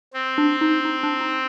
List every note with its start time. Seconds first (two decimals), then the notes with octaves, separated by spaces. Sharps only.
0.14 C4
0.38 D4
0.61 D#4
0.85 D#4
1.03 D4
1.21 D#4